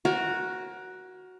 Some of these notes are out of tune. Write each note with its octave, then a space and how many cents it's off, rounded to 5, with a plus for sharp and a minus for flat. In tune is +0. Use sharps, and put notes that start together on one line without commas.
F#4 +0 A#4 +20 C#5 -25